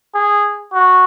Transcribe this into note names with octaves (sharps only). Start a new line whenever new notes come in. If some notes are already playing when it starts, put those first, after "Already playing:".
G#4
F#4